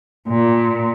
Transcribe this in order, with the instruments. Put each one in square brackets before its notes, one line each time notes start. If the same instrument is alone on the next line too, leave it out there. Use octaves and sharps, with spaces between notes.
[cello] A#2